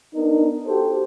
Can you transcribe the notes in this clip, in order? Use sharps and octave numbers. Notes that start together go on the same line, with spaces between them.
B3 D4 D#4 A#4
F#4 G4 A4 C5